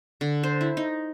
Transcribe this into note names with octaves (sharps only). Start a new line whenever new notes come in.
D3
C5
E4
D#4